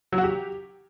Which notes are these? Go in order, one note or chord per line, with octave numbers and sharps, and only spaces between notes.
F#3
F#4
G4